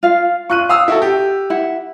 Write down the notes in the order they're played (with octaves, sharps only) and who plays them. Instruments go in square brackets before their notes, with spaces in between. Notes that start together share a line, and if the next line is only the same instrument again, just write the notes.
[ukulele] F4 F5
[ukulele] F4 [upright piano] C#6 F#6 D#7
[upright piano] F5 D#6 E6
E4 F#4 A4
G4
[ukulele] E4 F#5